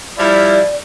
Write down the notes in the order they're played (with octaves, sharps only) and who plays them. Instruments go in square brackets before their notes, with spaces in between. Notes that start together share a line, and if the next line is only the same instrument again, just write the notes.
[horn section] F3 G3 E4 [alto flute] D5